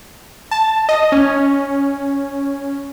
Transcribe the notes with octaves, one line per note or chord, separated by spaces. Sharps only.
A5
D#5
C#4